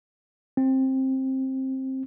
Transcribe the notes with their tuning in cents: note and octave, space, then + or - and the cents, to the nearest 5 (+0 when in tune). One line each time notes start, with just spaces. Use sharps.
C4 +15